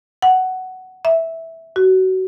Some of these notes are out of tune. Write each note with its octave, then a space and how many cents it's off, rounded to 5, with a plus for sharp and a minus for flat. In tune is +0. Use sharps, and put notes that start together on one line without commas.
F#5 +10
E5 -10
F#4 +25